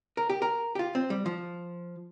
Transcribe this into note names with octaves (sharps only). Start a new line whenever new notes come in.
A#4
G4
A#4
G4
F4
C4
G3
F3